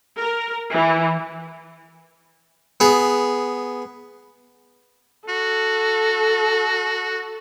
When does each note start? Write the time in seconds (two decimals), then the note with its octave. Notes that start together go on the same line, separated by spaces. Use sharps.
0.21 A#4
0.72 E3
2.80 B3 G#4
5.28 F#4 A4